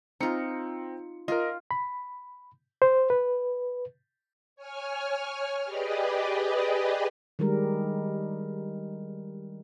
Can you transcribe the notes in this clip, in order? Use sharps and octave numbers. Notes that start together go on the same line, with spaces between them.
C4 D#4 F4 C#7
F4 A#4 D#5
B5
C5
B4
C#5 G#5 F6
G4 G#4 B4 D5 D#5
D#3 G3 G#3 A#4